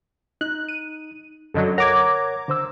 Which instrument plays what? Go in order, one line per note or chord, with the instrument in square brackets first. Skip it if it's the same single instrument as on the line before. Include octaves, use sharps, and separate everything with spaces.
[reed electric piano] D#4 [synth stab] F#6
[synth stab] D#7
[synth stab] F#2 D3 F#3 [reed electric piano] A4 D#5
[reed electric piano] A#4 C#5 F#5 [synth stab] A#5 D6 G#6
[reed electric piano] D3 C5 E6